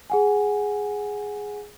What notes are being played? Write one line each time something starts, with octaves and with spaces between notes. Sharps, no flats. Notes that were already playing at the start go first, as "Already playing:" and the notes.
G#4 F#5 G#5